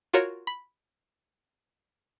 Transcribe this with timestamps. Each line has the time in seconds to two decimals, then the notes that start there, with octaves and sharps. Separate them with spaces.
0.14 F4 F#4 A#4 C#5
0.47 B5